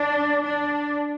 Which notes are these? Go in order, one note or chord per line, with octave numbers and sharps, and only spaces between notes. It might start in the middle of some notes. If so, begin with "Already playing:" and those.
Already playing: D4
D4